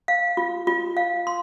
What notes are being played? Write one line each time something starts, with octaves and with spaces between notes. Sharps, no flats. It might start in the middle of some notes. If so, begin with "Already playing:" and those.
F5
F4
F4
F5
C6